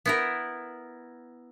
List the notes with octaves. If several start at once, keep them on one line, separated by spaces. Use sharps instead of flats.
B3 E4 A#4